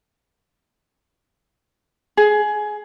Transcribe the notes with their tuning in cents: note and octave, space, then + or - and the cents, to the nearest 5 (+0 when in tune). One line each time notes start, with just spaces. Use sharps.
G#4 +20